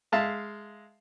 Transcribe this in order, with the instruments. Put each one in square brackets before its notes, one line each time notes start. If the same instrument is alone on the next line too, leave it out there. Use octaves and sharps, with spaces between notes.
[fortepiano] G#3 E5 F5 A5